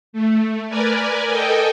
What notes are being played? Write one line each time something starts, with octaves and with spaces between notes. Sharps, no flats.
A3
A#4 B4 D5 G#5
A4 D#5 G5 G#5